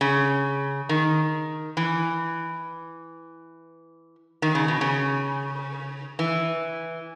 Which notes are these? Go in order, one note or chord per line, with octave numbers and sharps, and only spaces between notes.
C#3
D#3
E3
D#3
C#3
B2
C#3
E3